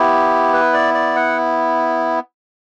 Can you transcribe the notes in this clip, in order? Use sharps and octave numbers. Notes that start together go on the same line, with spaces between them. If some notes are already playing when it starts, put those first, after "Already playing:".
Already playing: B3 E4 G4
B4
D5
D5
F#5